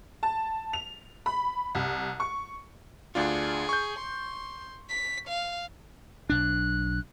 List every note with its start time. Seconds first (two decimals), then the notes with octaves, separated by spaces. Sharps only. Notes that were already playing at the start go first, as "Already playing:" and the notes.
0.23 A5
0.73 F7
1.26 B5
1.75 C2
2.20 C#6
3.15 D2 D4 F4 G#4
3.69 C#6 G6
3.99 C6
4.89 B6
5.28 F5
6.30 B1 D4 F#6